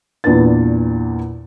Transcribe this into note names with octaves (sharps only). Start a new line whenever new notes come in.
E2 A#2 D4 B4 A6